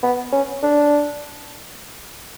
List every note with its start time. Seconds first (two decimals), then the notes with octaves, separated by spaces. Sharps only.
0.03 B3
0.32 C#4
0.63 D4